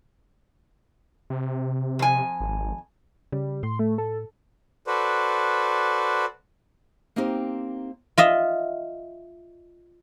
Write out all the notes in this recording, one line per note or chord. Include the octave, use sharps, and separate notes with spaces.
C3
F2 G#5
G#1
C#3 G3
A2 C6
A3
A4
F#4 A4 B4 C5 D5
A#3 C4 D#4 G4 C5
F4 D#5 E5